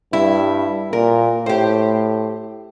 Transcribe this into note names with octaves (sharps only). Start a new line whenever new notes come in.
G2 E4
A#2 A#4
A2 G4 C5